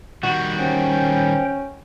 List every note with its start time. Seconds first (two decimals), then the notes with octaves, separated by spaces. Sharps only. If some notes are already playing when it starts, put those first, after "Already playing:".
0.23 D#3 G3 F#4
0.58 C#4 C5 G5